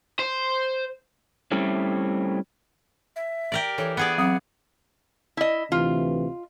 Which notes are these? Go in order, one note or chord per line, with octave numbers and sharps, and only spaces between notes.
C5
G3 A3 C4 C#4 E4
E5
G4 A#4 D5
E3 A4 C#5
B3 G#4 D5 F#5
F#3 C4 F#5 D#6
E4 D#5
D2 C3 E3 F4